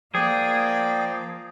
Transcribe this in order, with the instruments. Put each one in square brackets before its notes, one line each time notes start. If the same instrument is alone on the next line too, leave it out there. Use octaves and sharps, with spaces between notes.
[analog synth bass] F3 [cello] A#3 [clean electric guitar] G#4 [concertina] D5 G5